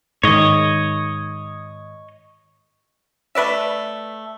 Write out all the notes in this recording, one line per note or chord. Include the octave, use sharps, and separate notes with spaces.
G#2 D#3 C#5 D#5
A3 B4 D5 E5